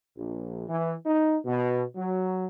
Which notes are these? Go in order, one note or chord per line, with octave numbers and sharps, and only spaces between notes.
A#1
E3
D#4
B2
F#3